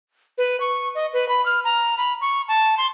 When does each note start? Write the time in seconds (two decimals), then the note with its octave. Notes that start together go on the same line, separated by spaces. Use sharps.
0.38 B4
0.60 C#6
0.95 D#5
1.13 B4
1.29 B5
1.46 F6
1.65 A#5
1.98 B5
2.21 C#6
2.48 A5
2.78 C6